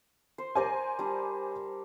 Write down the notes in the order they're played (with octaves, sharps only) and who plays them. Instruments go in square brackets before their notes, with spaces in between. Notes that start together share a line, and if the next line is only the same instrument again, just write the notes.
[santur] C5
[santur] A#4 D5 A#5 [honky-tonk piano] C5 G#5
[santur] G3 D4